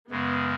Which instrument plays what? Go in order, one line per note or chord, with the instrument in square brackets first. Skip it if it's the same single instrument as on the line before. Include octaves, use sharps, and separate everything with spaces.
[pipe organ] F#2 C#3 G#3 [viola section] B3